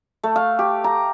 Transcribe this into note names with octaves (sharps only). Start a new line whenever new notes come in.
A3
F5
G4
A#5